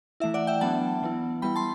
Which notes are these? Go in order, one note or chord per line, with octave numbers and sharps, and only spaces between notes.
E3 A3 E4 E5
D5 F#5
E5 G5
F#3 B3 D4 F#5 A5
E3 B3 E4
G3 B3 E4 G5 B5
A5 C6